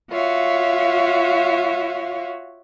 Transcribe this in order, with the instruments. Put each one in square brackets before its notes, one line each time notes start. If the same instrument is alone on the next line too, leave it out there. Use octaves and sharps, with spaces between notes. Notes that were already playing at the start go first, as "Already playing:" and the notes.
[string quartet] F4 F#4 C#5 E5 F5